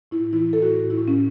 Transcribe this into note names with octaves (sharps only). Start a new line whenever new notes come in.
A2 E4
E3 E4
A2 A4
F#4
A2
E4
A2
C#4